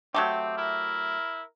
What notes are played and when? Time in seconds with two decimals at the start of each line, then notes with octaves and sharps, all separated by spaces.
0.14 F#3 A3 C4 G4
0.57 E4 A#4